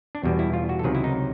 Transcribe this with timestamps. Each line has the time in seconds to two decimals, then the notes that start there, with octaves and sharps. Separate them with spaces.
0.15 D4
0.23 E2 B2 G3
0.39 E4
0.53 F4
0.69 F#4
0.79 A4
0.83 C#2 C3 D#3 F#3 G#4
0.95 E4
1.04 D#4